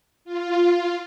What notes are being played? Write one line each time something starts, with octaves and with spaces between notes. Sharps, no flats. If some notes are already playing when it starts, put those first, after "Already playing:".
F4